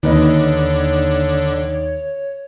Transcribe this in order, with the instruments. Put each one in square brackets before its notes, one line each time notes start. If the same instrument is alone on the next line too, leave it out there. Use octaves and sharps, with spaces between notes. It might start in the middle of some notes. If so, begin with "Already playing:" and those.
[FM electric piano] D#2 [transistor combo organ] D3 [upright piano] D#3 B4 D#5 [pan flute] C#5